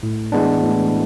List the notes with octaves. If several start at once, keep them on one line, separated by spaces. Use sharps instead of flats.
A2
E3 G#3 B3 D4
A2